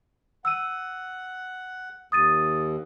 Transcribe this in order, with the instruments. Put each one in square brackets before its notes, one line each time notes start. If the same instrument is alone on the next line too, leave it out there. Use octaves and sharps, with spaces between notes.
[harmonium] F#5 [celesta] E6 D#7
[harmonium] D#2 [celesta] D#6 A6 D#7